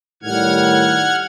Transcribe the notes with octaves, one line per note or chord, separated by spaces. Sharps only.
A2 D#3 G3 F#5 F6 G#6